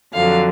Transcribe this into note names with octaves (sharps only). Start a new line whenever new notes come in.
F2 D3 F#3 F5